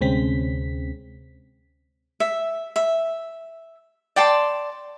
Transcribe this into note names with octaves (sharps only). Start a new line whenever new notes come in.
D2 C3 G#3 C4 C#4 B6
E5
E5
D5 G5 A5 C6